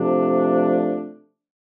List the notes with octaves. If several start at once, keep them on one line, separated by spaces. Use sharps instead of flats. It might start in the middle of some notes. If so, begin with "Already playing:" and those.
Already playing: C3 F3 A3 D4